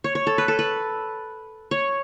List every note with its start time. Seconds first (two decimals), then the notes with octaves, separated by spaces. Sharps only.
0.04 C#5
0.15 C#5
0.27 A4
0.38 B4
0.48 A4
0.59 B4
1.71 C#5